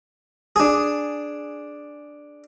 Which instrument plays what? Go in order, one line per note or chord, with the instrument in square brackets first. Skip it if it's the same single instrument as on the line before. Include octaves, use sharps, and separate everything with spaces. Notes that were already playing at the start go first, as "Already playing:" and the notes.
[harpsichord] D4 G#4